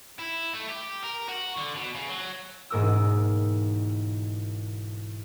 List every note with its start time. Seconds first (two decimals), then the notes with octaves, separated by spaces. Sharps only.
0.19 E4
0.53 A3
0.69 G4
1.03 A#4
1.29 F#4
1.58 D3
1.76 B2
1.95 C#3
2.09 F#3
2.70 E1 G#2 A#3 A#4 D#6 E6